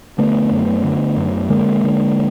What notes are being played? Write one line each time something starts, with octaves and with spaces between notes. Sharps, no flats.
D3 A3 B3
F#2
D3
F#2
D3 G#3 A#3
D3